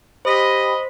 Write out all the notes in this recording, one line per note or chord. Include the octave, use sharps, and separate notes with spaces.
G4 C5 D#5 B5 B6